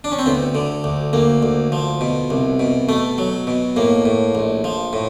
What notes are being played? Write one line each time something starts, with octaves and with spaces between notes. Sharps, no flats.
D4
C#4
C4
D2 B3
D3
D2
D2 A#3
D2
F3
B2
C2
B2
B2 A3
F#3
B2
A2 A#3
A2
A#1
F3
A2